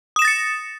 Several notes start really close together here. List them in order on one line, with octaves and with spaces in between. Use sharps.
D#6 E7 A#6 A6 C#7